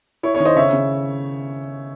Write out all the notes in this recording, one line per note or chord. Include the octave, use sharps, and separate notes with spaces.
E4 C#5
C#5
D#3
C5 D#5
C#3 C#5 E5
C#3